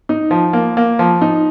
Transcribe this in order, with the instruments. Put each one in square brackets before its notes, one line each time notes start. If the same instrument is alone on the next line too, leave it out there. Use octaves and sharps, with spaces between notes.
[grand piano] D#4
F3
A#3
A#3
F3
D#4